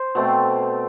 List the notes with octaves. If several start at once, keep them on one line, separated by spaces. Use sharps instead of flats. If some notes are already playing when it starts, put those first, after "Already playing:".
Already playing: C5
B2 A3 C4